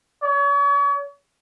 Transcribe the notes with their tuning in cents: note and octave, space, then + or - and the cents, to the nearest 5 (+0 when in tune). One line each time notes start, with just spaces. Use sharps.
C#5 +40